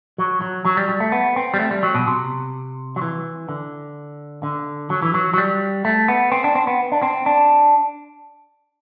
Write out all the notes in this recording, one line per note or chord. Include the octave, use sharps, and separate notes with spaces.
F#3
F#3
F#3
G3
G3
A3
B3
C4
G3
A3
G3
F#3
B2
C3
F#3
E3
D3
D3
F#3
E3
F#3
F#3
G3
A3
B3
C4
D4
C4
B3
D4
C4
D4